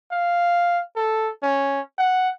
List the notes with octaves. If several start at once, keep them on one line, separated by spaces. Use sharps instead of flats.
F5
A4
C#4
F#5